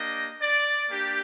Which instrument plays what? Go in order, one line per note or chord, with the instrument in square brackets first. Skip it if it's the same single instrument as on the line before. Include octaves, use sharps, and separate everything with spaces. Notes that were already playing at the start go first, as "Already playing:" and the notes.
Already playing: [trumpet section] A#3 D4 G4 D#5
D5
A#3 D4 G4